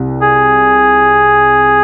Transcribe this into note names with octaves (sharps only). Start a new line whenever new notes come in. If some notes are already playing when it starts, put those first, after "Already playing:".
Already playing: C2
G#4